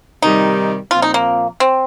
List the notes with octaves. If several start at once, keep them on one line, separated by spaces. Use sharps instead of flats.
C3 D#3 G3 D#4
A#2 F3 C4 F4
D#4
A#3
C4